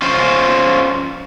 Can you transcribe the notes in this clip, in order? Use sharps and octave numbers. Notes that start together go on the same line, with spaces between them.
C#4 F4 C5